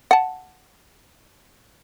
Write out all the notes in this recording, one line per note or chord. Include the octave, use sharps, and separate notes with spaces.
F#5 A5